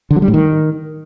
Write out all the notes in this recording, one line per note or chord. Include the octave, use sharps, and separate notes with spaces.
D3
F#3
G3
A2
D#3